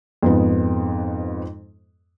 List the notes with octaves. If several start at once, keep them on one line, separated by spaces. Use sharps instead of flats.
F2 G#2 B3